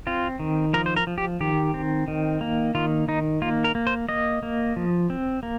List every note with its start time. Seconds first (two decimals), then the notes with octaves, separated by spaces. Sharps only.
0.07 C4 F4
0.39 D#3
0.74 F3 A#4
0.86 C5
0.96 A#4
1.07 F3
1.18 G4
1.40 D#3 G4
1.74 C4
2.08 D#3
2.41 A#3
2.75 D#3 F4
3.08 D#3 D#4
3.42 A#3 F4
3.64 A#4
3.75 A#3
3.87 C5
4.09 A#3 D#5
4.43 A#3
4.76 F3
5.10 C4
5.43 A#3